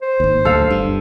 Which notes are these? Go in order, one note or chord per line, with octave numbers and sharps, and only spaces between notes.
C5
G#1 D#2
D2 A4 F5
G1 G2